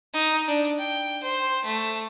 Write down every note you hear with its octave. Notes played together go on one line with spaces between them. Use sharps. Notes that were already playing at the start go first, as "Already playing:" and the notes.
D#4
D4
G5
C5
A3